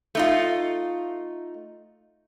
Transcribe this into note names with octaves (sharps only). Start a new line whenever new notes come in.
A3 D#4 F4